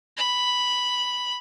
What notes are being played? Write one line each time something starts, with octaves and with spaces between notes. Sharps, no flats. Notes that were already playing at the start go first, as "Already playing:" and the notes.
B5